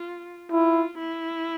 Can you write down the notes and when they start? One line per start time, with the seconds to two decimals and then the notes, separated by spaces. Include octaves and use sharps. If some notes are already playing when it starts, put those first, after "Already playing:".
Already playing: F4
0.51 E4 F4
0.99 E4